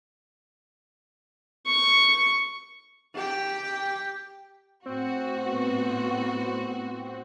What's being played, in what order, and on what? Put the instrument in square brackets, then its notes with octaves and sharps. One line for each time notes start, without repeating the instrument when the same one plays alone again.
[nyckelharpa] C#6
[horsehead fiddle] G4 G5
[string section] A2 F#4 [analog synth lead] C4
[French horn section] B3